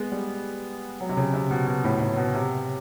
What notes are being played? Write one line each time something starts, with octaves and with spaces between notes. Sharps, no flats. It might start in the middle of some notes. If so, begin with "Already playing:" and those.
Already playing: G#3 B3
G3
F#3
C3
C#3
C3
B2
B2
A2
A2
B2
C3